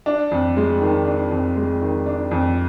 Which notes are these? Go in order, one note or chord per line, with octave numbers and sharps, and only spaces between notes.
D4
F2
G#3
D#3
D4
F2
G#3
D#3
D4
F2